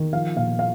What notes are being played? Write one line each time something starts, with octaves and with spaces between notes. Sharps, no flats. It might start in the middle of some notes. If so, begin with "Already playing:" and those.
Already playing: D#3
F3 F5
A#2 F5
F5